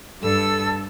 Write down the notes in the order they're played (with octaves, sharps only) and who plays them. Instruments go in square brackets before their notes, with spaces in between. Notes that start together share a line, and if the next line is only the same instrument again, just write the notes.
[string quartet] G2 E6 [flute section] A4